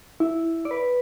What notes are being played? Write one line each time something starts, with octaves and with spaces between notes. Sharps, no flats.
E4
D5
B4